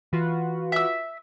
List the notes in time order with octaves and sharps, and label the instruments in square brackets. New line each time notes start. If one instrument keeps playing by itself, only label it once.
[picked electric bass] E3 [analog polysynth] F4 F#4 B4
[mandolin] E5 E6